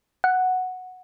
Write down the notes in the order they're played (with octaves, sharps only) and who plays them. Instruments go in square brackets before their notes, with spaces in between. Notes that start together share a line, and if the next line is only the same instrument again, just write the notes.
[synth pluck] F#5